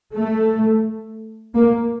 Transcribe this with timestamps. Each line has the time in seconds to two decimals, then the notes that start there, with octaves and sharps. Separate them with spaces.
0.16 A3
1.56 A#3